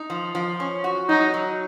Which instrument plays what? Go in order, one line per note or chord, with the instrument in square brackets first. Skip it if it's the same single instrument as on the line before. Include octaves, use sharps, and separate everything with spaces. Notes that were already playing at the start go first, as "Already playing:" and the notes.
Already playing: [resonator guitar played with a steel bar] D#4
F3
F3
C#4
F#4
[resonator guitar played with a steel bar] F#3 [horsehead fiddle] D#4
[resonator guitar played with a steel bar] F#3